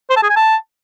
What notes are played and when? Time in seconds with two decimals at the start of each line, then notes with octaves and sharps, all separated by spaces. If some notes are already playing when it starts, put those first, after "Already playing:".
0.10 C5
0.16 A5
0.23 G#4
0.30 G#5
0.36 A5